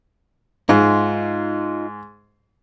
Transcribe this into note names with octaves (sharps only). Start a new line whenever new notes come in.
G#2 D#4 F4